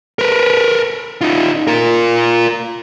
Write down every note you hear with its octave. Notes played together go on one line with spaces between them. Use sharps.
A#4 B4
D#4 F4
F4 A#4